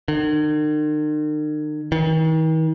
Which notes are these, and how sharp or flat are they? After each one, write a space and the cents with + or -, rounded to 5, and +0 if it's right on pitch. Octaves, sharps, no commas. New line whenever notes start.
D#3 -45
D#3 +45